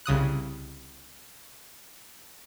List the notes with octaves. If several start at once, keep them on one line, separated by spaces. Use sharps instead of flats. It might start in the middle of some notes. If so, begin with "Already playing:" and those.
C2 C#3 D#6 F#6